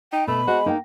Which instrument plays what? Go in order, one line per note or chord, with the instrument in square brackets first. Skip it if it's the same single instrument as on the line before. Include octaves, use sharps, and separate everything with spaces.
[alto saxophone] D#4 [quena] G5
[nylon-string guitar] B2 [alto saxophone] A3 [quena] B5
[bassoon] G#3 [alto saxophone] F#4 [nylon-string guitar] C5
[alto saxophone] A#3 [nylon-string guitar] D#4 G5